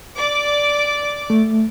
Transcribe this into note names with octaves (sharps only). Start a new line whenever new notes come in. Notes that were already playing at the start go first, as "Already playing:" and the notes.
D5 D6
A3